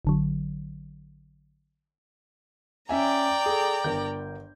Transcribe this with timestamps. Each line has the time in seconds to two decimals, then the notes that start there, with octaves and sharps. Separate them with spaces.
0.05 A1 D3 F#3
2.89 C#4 D5 E5 G5 G#5 A#5
3.46 G#4 A4
3.84 G1 A#4 G6